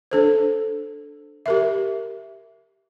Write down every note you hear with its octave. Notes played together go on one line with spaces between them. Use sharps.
D4 A4 C5
G4 A#4 E5